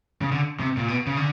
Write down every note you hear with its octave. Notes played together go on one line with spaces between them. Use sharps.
C#3
D3
C3
A#2
B2
C#3
D3